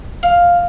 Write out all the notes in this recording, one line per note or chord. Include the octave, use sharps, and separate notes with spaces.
F5